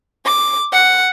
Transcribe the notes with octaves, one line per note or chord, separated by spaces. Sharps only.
D6
F#5